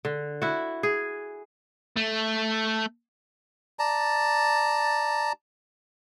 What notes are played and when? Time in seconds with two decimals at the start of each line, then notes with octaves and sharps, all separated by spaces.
0.05 D3
0.42 E4 F#4
0.83 G#4
1.96 A3
3.79 D5 A5 A#5